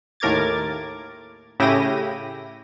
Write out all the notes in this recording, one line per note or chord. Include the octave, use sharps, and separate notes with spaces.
D#2 A2 A#4 D6 G#6 A6
A2 C#3 E4 G4 A#6 D#7